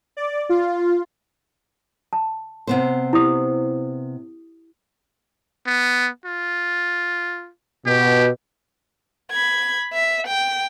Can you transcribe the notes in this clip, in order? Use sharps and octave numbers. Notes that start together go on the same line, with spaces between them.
D5
F4
A5
C3 B3 C5
E4 G4 D#6
B3
F4
B2 G4
B5 G#6
E5
G5